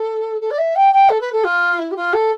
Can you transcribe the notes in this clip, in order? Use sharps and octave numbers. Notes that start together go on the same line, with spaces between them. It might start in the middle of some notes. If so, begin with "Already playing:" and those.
Already playing: A4
A4
D5
E5
G5
G5
A4
B4
A4
F4
E4
G4
F4
A4